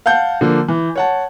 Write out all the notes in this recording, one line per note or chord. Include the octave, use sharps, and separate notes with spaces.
F5 F#5 A5 G6
D3 F3 A#3
E3
C#5 F#5 A5